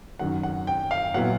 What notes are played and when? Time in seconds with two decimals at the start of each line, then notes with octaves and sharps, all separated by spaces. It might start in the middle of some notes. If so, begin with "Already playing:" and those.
0.19 F#2 D#3 F#3 F#5
0.43 F#5
0.67 G5
0.91 F5
1.14 A#2 F#3 B3 E4 F#5